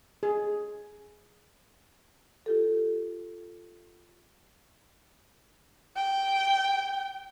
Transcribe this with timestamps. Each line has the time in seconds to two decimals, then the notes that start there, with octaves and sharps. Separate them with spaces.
0.23 G#4
2.46 F4 G4 A4
5.96 G5